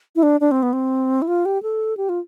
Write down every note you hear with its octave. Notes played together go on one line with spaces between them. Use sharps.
E4
D4
D4
C4
B3
C4
E4
F4
G4
A4
G4
F4